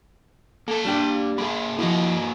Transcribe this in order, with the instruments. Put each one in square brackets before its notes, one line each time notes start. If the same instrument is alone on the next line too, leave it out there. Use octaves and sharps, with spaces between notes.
[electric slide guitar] A#3 A5 [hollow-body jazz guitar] A4
[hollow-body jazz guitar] G3 D4 G4
[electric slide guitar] A#3 G#4 [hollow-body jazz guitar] B5
[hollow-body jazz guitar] F3 E4 [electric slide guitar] A#3 F#4 D#5